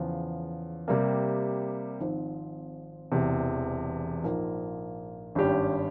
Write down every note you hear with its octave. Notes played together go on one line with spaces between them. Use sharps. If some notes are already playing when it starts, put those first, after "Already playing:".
Already playing: E2 C#3 F3
C3 G3 A#3
G#1 G#2 F3 C4
E1 E2 C3
A#1 G#2 F3 A#3 F4
G#1 G2 G3 C#4 G4